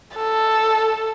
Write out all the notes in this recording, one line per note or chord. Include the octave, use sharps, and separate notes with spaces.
A4